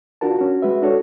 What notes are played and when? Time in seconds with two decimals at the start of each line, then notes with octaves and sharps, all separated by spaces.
0.21 D4 F4 F#4 A#4 A5
0.39 C#4 F#4
0.62 G#3 F#4 B4 E5
0.82 D4 F#4 A4 C#5